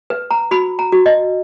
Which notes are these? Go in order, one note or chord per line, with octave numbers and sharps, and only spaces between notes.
B4
A#5
F#4 B5
A#5
F#4
D#5